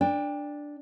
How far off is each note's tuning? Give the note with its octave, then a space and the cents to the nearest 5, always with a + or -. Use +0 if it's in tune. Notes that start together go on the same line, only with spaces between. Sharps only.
D4 +0 G5 +30